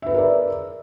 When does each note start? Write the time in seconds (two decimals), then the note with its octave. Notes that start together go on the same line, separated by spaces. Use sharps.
0.02 E5
0.06 B4
0.10 G#4
0.14 A#4
0.19 D5